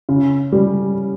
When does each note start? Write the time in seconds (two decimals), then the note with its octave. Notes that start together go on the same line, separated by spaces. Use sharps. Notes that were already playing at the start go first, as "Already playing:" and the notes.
0.09 C#3
0.52 G3